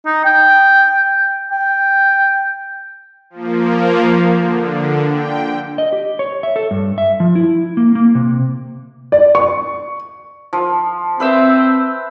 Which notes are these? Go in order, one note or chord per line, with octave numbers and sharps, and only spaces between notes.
D#4
G5
G5
F3 A#3
D3
G5
D#5
G4
C#5
E5
A4
G2
E5
F3
E4
A#3
A#3
C3
D5
C#6
F3
C4 B4 E5 E6